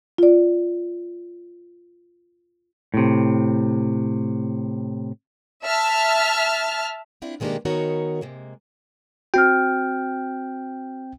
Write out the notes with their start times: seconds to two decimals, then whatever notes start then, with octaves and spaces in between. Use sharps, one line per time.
0.18 F4 D5
2.94 A2 C3
5.65 E5 A5 F6
7.22 C4 D4 E4 F4
7.40 B2 D#3 G#3 A#3 D4 G4
7.65 D#3 B3 D#4 F#4 A#4 C#5
8.21 C3 G#3 A#3
9.34 C4 F#4 G5 F6